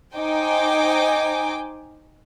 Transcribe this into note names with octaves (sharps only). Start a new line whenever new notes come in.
D#4 C5 G5 G#5 D6